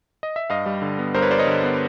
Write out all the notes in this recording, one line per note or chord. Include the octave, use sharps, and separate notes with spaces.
D#5
E5
G2 D#5 F5
G3
D3
B3
G2 A#4 C5
B4 C#5
G3 C5 D5
C#5 D#5
D3
B3